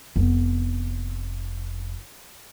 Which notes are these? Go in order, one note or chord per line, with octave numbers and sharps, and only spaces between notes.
F1 B3